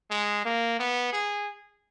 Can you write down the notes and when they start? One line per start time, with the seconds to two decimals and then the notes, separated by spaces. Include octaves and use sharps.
0.11 G#3
0.45 A#3
0.79 B3
1.13 G#4